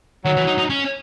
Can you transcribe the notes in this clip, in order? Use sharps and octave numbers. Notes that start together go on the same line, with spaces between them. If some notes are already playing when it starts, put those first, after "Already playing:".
D#3 F#3
E3
D#4
D#4
C#4